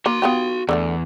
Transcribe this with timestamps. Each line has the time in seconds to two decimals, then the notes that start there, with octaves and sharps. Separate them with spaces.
0.06 A#3 F#4 C6
0.22 B3 F4 G4
0.69 E2 D3 F#3 A3